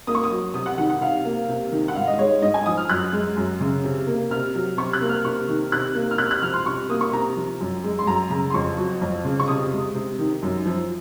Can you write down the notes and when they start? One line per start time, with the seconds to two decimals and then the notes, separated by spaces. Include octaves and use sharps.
0.07 A#3 D#6
0.15 C#6
0.24 D#6
0.30 F#3
0.54 C3 D#6
0.66 F#5
0.78 D#3 F#5
0.90 F#5
1.01 C3 F5
1.25 A#3
1.49 C3
1.72 D#3
1.88 F#5
1.95 G#2 F5
2.07 D#5
2.19 G#3 C#5
2.42 G#2 D#5
2.54 G#5
2.66 F3 D#6
2.77 F6
2.90 F#2 F#6
3.13 G#3
3.37 F#2
3.61 C#3
3.84 C3
4.07 A#3
4.30 C3 F6
4.55 F#3
4.77 C3 C#6
4.93 F#6
5.01 A#3
5.09 F6
5.25 C3 C#6
5.49 D#3
5.72 C3 F#6
5.95 A#3
6.11 F6
6.18 C3 F#6
6.31 F#6
6.42 F3 F6
6.54 C6
6.66 C3 C#6
6.89 A#3 D#6
7.01 C#6
7.13 C3 A#5
7.36 F3
7.60 F#2
7.84 G#3
7.99 C6
8.07 F#2 A#5
8.30 C#3 A#5
8.50 C6
8.54 F2 C#6
8.77 F#3
9.01 F2
9.25 C#3
9.40 C#6
9.48 C3 D#6
9.72 G#3
9.95 C3
10.19 D#3
10.43 F#2
10.66 F3